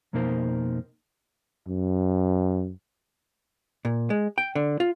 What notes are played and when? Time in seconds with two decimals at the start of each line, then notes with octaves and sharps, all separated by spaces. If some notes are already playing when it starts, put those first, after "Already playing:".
0.13 F2 B2 A#3 D#4 A#4 C5
1.69 F#2
3.85 A#2
4.10 G#3
4.38 G5
4.55 D3
4.80 F4